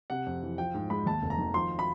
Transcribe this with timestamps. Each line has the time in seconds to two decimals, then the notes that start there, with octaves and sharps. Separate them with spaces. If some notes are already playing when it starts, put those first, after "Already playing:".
0.10 C3 F#5
0.26 F2
0.43 E3
0.58 F3 G5
0.74 G#2
0.90 G#3 B5
1.06 D#2 A5
1.22 F1
1.30 A#5
1.38 D#3
1.54 F3 C6
1.79 B5